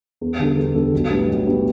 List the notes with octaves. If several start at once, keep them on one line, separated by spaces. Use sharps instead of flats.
E2
D3 G3 D4 A4
E2
D3 G3 D4 A4
B1
A2 G3 B3 D4
B1
A2 G3 B3 D4